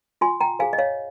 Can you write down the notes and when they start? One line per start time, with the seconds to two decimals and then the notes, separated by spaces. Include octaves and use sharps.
0.21 F4 G#5 C6
0.40 G5 A#5
0.59 G#4 C5 F5 G#5
0.73 D#5
0.78 C#5 F5